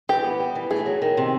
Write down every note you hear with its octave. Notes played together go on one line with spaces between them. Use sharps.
E3 G4
B3
G3
E3
A3 G#4
F#3
D#3
C3